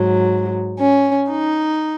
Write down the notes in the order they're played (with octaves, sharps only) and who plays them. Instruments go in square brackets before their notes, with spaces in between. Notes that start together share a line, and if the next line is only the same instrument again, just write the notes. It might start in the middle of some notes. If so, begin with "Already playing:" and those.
Already playing: [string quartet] G#2 F#3
C#4
D#4